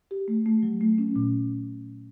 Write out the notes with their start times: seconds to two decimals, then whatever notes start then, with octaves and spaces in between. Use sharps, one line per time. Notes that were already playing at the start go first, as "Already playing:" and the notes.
0.11 G4
0.28 A3
0.46 A3
0.63 F#3
0.81 A3
0.98 C#4
1.16 A#2